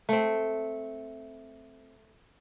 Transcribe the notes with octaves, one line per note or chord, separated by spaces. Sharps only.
A3 C4